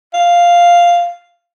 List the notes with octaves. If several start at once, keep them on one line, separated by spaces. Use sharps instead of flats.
F5